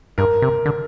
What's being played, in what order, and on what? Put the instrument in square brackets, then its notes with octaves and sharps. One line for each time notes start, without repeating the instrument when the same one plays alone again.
[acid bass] G2 [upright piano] A#4
[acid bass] C3
D3